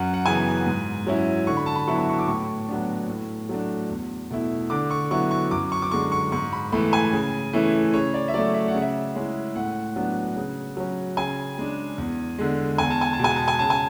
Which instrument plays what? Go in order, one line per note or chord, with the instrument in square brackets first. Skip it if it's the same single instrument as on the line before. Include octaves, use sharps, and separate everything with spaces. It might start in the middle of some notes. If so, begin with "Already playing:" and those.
Already playing: [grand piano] F#2 F#5
F#5
C#3 E3 B3 G#5
G#2
F#3 C#4 E4
D3 C#6
B5
A5
B5
F#3 B3 E4 C#6
B5
C#6
D6
A2 C#6
F#3 B3 D4
A2
F#3 A3 D4
E2
B2 A3 E4
D3 D6
C#6
F#3 B3 E4 C#6
C#6
F#2 D6
C#6
D6
D3 G#3 C#6
C#6
G#2 C#6
B5
E3 A3 B5
G#5
C#3
E3 A3 C#4 E4
C#3 C#5
D5
E5
F#3 A3 D5
E5
F#5
C#3
E5
G#3 C#4 E4
A2 F#5
F#3 B3 D4
C#3
F#3 C#4
C#3 G#5
G#3 D4
E2
D3 G#3
E2 G#5
A5
G#5
A5
B2 G#3 G#5
A5
G#5
C#3 A5
G#5